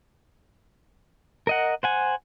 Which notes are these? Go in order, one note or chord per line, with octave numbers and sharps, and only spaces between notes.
A#4 D#5 F#5
C5 F#5 G#5